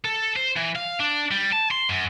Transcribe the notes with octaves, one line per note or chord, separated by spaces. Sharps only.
A4
C5
E3
F5
D4
G3
A5
C6
F#2